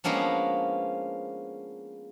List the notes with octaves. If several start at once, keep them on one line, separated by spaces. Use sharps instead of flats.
F3 G#3 A#3 B3 C#4 D4